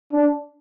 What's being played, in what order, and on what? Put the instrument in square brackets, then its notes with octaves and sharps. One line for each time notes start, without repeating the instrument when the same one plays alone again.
[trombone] D4